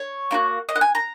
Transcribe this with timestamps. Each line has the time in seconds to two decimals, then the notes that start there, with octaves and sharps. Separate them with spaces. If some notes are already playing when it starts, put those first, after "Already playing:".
Already playing: C#5
0.31 A#3 D#4 F#4
0.69 D#5
0.76 F#5
0.81 G#5
0.95 A#5